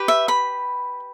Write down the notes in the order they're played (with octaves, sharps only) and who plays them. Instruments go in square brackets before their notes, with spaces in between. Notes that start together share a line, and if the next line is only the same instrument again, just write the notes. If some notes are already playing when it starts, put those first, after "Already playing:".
Already playing: [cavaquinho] G4 B4
E5
B5